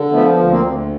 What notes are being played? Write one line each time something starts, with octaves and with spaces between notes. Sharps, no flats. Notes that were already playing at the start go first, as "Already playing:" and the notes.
Already playing: D3
F3 A3 B3
D2
A#3 C4
D2